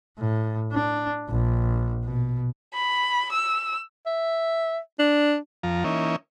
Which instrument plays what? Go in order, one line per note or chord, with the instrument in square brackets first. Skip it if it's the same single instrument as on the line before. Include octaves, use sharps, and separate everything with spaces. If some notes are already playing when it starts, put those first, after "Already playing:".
[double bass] A2
D4
A#1
B2
[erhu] B5
E6
[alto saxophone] E5
D4
[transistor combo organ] F2 F3 A#5
E3 A#3 C#4 D#4